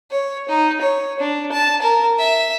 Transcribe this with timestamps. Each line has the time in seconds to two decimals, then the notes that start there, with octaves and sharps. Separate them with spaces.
0.11 C#5
0.49 D#4
0.82 C#5
1.19 D4
1.52 A5
1.82 A#4
2.19 E5